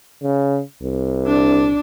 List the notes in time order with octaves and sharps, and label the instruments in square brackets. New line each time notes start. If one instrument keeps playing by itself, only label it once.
[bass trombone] C#3
C2
[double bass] D4